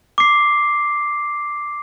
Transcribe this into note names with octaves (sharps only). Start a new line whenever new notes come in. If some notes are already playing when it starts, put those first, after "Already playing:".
D6 C7